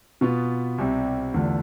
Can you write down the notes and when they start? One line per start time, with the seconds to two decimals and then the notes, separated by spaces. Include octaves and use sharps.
0.21 B2 B3 F4
0.78 C2 C3 G3
1.34 E2 D3 A3 D4 F4